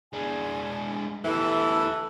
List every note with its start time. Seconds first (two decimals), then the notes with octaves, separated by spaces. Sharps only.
0.13 G#3 D4 G#5
1.25 D2 E3 G4 A4